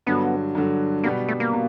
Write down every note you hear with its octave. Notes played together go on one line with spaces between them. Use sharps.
G2 D3 F#3 B3
G2 D3 F#3
B2 G3 A#3 B3
A3
A#3
B2